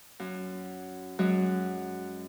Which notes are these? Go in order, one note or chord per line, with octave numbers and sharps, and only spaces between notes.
F#2
F#2 F#3 G#3